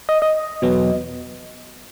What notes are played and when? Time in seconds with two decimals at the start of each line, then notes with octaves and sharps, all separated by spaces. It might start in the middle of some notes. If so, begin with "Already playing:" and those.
0.09 D#5
0.22 D#5
0.62 E2 B2 F#3 B3